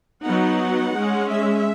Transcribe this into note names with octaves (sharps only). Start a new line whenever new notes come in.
F#3 B3 D#4 F#5
G#3 C#4
E5